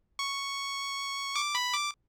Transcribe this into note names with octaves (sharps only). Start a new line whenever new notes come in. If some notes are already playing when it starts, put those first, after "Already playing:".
C#6
D6
B5
D6